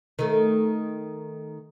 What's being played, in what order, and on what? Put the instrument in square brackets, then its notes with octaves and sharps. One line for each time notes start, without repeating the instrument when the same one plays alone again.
[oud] D#3 A3